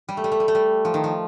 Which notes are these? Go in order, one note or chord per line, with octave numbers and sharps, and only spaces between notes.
G3
A3
G3
A3
G3
A3
G3
F3
D#3
F3